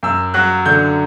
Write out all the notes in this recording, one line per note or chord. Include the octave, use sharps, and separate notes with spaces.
F#2 E6
F#3 F#6
D3 G6